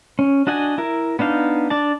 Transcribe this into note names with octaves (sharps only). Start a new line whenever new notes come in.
C#4
D4 F#4 D#5 F#5 G#5
E4 A#4
B3 D4 D#4 F5
D4 D5 A5